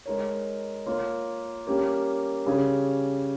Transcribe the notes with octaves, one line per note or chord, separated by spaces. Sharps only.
G#3 D#4 A#4 C#5
A#3 F4 A#4 C#5
G3 A#3 C#4 G4 A#4
C#3 G3 C#4 G#4